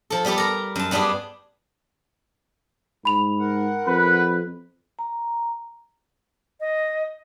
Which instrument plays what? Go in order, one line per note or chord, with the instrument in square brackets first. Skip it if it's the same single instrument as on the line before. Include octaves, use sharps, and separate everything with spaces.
[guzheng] F3 A4
G3 B3 G4 A4
A#4 A#5
F#2 A5
G2 B3 D4 G4 G#4
[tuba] G#2 [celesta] B5 F7
[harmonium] A#4 F#5
[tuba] F2 [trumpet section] B4
[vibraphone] A#5
[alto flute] D#5